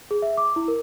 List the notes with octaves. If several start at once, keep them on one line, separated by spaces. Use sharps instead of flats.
G#4
E5
D6
E4
A#4